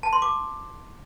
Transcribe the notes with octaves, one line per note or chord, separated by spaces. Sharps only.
A5
C6
D6